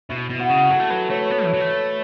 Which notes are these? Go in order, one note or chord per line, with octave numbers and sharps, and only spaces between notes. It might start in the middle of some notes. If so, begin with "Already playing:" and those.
B2 E4
B2
F#4
C#3
F#3 A4
A3
F#3 B4
A3 C#5
B3 B4
E3
F#3
A3